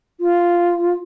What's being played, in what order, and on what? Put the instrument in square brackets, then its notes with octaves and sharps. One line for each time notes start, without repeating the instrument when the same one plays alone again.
[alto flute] F4